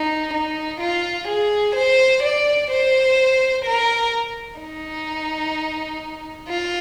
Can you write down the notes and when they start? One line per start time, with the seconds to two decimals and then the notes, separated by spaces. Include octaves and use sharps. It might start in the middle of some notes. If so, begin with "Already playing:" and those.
Already playing: D#4
0.33 D#4
0.80 F4
1.28 G#4
1.75 C5
2.23 D5
2.70 C5
3.65 A#4
4.60 D#4
6.49 F4